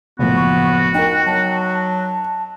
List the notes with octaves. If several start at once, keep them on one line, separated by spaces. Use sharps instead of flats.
F#1 A2 F3 B3 F#4
C#6
D#4 A#4 G5
F#3 A5